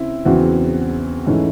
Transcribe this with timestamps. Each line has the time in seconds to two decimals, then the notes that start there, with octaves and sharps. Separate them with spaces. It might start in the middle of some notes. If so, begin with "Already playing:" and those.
Already playing: C#3 C4 E4
0.25 E2 C#3 E3 C4 F#4
1.26 G#2 E3 A3 C#4